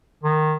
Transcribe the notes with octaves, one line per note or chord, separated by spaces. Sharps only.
D#3